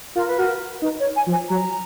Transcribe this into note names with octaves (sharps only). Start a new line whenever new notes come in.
F4 A#4
B4
F#4 A#4
D#4 B4
C#5
G#5
F3
G#5
F#3 A#5